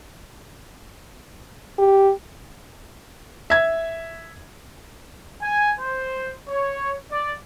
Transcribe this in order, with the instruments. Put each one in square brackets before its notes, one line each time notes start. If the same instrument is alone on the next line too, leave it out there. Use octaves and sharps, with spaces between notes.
[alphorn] G4
[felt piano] E5 G#6
[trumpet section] G#5
C5
C#5
D5